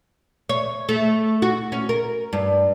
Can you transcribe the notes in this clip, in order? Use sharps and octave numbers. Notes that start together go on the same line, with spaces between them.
C#5
A3
F#4
C#4
A#4
G2